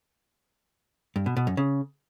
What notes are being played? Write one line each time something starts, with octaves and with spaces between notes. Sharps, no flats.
G2
B2
B2
F#2
C#3